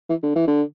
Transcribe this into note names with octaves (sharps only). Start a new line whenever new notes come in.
E3
D3
E3
D3